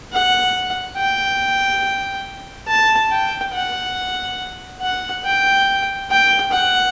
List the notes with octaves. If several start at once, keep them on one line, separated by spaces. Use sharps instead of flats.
F#5
G5
A5
G5
F#5
F#5
G5
G5
F#5